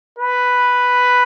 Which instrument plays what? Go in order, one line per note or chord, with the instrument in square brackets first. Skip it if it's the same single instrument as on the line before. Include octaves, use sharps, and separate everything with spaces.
[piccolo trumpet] B4